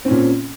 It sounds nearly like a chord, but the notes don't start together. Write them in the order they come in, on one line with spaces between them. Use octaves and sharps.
C4 C#4 A#2